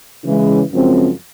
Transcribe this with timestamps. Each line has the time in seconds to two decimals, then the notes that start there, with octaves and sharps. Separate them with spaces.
0.24 C#3 E3 G#3
0.72 F#2 C#3 F3 G#3 C4